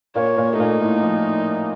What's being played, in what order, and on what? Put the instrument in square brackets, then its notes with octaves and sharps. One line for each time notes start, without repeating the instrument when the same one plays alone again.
[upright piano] A#2 A#3 [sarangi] C#5
[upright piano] A#2 A#3
A3
[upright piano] A#2 A#3 [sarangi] D#4
[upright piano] A2 A3
F3